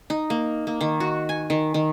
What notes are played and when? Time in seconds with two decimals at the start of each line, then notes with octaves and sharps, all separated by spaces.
0.10 D#4
0.30 A#3
0.67 A#3
0.81 D#3
1.00 F#4
1.29 G#5
1.50 D#3
1.74 D#3